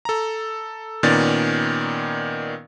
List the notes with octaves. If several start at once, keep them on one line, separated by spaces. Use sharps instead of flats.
A4 A#5
A#2 D#3 B3 C#4 D5 A6